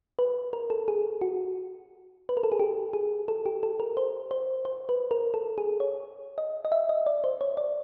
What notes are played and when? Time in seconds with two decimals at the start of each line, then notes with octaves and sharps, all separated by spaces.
0.19 B4
0.53 A#4
0.70 A4
0.88 G#4
1.21 F#4
2.29 B4
2.37 A#4
2.43 A4
2.52 G#4
2.59 G4
2.93 G#4
3.28 A4
3.46 G4
3.63 A4
3.80 A#4
3.97 C5
4.31 C5
4.65 C5
4.89 B4
5.11 A#4
5.34 A4
5.58 G#4
5.80 C#5
6.38 D#5
6.65 D#5
6.72 E5
6.89 D#5
7.06 D5
7.24 C5
7.41 C#5
7.57 D5